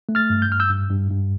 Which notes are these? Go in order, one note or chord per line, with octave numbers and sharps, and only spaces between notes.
A3
F6 A6
G2
G6
G2 F6
E6 G6
G2
G2
G2